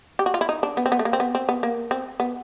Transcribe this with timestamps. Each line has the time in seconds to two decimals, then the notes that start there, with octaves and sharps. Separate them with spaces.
0.19 G4
0.26 F#4
0.34 F4
0.41 E4
0.49 D#4
0.63 D4
0.77 B3
0.86 C4
0.92 B3
0.99 A3
1.05 A#3
1.13 C4
1.20 B3
1.35 C4
1.49 B3
1.63 A#3
1.91 C4
2.20 B3